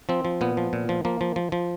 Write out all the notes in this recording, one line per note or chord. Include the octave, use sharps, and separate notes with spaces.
F3 C4
F3
A#2 B3
F3
A#2
F3
F3 A#3
F3
F3
F3